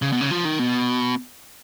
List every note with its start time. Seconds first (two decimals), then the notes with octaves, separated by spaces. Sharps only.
0.02 C#3
0.12 B2
0.21 C#3
0.31 F3
0.45 D#3
0.59 B2